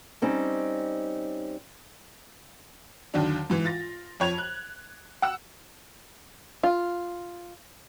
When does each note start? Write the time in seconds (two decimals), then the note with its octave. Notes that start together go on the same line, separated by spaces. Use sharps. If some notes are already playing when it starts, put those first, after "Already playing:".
0.22 G3 C4 C#4 D#4
3.14 D#2 D3 D#3 F#3 D4
3.50 G#2 E3
3.65 F4 A6 A#6
4.20 F2 C#5 G#6 F7
4.38 F#6
5.22 F#5 E6
6.63 F4